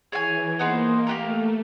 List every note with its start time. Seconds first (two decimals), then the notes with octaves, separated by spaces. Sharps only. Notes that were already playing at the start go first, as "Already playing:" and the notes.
0.12 E3 G#4 C#5 F5 G#5
0.59 A#3 B3 D#4 G#4 C5
1.07 A3 A#3 D4 G4 A#4